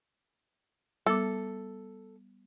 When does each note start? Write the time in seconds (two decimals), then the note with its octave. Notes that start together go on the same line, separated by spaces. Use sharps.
1.06 G3 B3 A4 D6